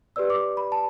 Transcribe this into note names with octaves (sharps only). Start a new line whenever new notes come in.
G4 B4 D5 E6
D6
B5
A5